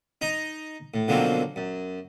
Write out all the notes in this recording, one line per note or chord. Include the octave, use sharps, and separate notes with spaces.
D#4 D#5 A#5
A2
B2 D3 F3 F#3 A#3 C4
F#2